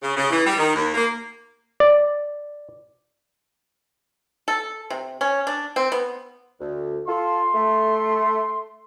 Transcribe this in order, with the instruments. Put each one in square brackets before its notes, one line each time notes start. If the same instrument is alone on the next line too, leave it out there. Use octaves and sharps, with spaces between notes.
[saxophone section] C#3
C#3
E3
G3
D#3
D#2
A#3
[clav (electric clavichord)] D5
[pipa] A4
C3
C#4
D4
C4
B3
[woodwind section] D2
[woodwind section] F4 A4 [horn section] C6
[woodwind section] A3